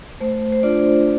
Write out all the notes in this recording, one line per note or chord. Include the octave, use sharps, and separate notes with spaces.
A3 C5
C5
D4 F4 D5